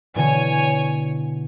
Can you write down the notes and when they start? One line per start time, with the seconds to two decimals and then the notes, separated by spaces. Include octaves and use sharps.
0.15 B2 D3 E3 C#5 G#5